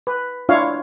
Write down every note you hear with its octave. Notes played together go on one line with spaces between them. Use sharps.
B4
D4 E4 F4 C#5 F5